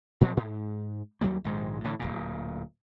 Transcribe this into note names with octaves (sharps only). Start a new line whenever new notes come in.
A#2 F3 F#3 C4
G#2
D#2 F#3 G3 A#3
A#1 G#2 D#3 G#3
A2 D3 E3
D1 G1 A#2